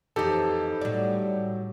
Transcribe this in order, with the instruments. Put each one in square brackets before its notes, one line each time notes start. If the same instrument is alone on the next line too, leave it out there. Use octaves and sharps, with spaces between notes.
[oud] F2 E3 [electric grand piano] D#4 G4 A4
[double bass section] A2 G3 [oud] F#3 D5